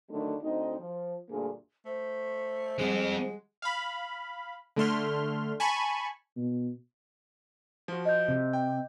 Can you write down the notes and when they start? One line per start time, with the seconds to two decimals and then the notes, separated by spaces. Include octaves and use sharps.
0.11 D3 D#3 F#3 A3
0.42 D2 C4 D#4
0.79 F3
1.30 D2 G2 A#2 A#3 G#4
1.85 A3 C5
2.78 F3 G3 G#3 C4 F#5
3.62 F5 B5
4.76 D3 A3 C6 F6
5.60 G#5 A5 B5 C#6
6.36 B2
7.88 F3 F#4
8.05 D#5 G6
8.28 C3
8.53 G5